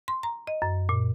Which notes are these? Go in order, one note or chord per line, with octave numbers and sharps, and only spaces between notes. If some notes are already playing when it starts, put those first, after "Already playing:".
C6
A#5
D#5
F#2
A#2